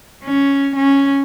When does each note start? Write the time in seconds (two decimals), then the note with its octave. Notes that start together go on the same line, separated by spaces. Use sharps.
0.24 C#4
0.76 C#4